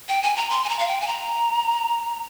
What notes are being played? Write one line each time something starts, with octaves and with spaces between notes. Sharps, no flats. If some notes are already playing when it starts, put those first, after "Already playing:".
G5
G#5
A#5
C6
G#5
A#5
F5
G5
G#5
A#5